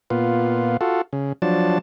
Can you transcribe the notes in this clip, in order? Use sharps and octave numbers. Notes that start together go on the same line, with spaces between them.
A#2 B3 F4
F4 F#4 A4
C#3
F3 F#3 D4 A5